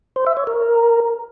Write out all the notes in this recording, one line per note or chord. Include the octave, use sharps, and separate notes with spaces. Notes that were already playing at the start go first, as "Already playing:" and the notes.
C5
E5
C#5
A#4